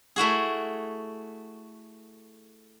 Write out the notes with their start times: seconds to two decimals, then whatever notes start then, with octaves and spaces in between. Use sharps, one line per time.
0.16 A3 E4 F#4 G#4